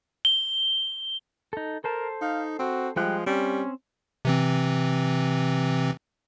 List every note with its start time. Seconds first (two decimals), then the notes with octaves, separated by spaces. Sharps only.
0.25 G7
1.53 D#4 A4
1.84 A4 A#4 C5 A5
2.21 D#4 F5
2.59 C4 F#4
2.96 F3 G3 G#3 G5 F#6
3.26 G3 C4 C#4
4.25 C3 E3 C4